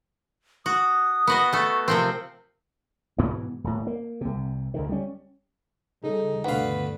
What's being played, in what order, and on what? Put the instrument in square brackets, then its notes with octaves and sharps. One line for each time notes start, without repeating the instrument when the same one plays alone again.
[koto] F#4 [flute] D#6
[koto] B3 F#4 D#5
[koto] A3 A4 [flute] C#6
[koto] C3 F3 C4 [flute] A#4
[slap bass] G#2 B2 E3 B3
D#1 A2
A#3
C2 C3
C#2 D3 D#3
G3 C#4
[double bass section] C#3 G3 [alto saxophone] D#4 [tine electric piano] G#4 A4
[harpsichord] D2 F5 [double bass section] G2 B2 D3 [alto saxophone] B4 [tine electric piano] F#5